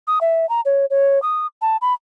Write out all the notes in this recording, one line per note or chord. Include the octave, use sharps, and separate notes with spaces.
D#6
E5
A#5
C#5
C#5
D#6
A5
B5